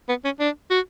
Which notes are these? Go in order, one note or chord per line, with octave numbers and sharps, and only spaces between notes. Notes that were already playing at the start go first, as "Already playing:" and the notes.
B3
C#4
D4
F#4